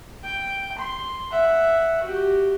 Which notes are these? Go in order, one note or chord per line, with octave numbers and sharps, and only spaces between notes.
G5
C6
E5 F#5
F#4 G4